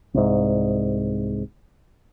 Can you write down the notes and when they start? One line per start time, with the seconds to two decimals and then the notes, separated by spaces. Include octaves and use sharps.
0.14 C2 G#2